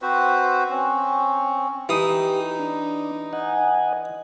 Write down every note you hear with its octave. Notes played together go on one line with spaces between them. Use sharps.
C4 F#4 B4 C5
C4 C#4
E3 D#4 G4 D#6
D4
D#5 F#5 G#5